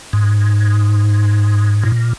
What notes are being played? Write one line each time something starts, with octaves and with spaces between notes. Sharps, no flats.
G#2
A#2